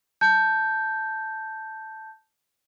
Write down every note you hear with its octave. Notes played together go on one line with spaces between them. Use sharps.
A5 G6